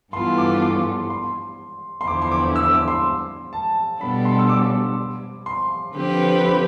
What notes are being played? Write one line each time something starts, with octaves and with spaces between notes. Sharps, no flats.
G2 E3 B3 F4 A4 C6
D6
D6
C6
C6
E2 D3 F3 B3 E4 D6
C6
D6
E6
D6
C6
A5
B2 G3 B3 D4 A4 B5
C6
E6
D6
C6
D3 F3 C4 G4 B4
B5